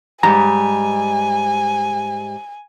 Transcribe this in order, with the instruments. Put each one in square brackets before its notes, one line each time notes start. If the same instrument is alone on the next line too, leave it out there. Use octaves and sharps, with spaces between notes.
[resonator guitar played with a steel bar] G#2 G3 [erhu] G#5 [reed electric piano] A#5